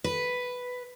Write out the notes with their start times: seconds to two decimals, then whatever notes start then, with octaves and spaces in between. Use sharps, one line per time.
0.04 B4